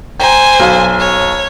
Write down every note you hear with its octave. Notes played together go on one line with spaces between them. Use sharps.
C5 G5 G#5 A#5
B1 F5
C#5